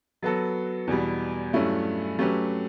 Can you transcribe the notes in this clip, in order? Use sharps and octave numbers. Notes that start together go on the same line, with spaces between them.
F#3 B3 F#4 A4
E2 B2 G3
G2 F#3 A3 C#4 E4
F#3 A3 C#4 G4 B4